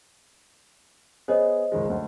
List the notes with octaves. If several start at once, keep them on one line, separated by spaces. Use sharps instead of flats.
B3 G#4 C5 C#5 D#5
C#2 D#3 G#3
D2